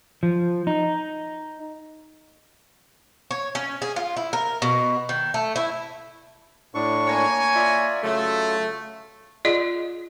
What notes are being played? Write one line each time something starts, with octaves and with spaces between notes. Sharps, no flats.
F3
D#4
C#5
C#4
G#4
F4
E4
A#4
B2
D#3
A3
E4
A2 D4 C#6
A#3 C#5 G#5
F4 D5 E5
C#3 F#3 A3 F4
F4 G#4 D5 D#5